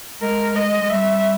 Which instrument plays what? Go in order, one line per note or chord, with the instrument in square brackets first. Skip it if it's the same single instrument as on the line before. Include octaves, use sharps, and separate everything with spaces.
[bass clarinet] G#3 [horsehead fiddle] A#4
[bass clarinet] G#3 [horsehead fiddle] D#5
[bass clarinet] G#3
[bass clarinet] G3 [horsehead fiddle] E5